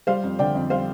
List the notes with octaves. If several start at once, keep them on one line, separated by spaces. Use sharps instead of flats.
G3 C5 F5
F2
D3 D5 G5
F2
G3 C5 F5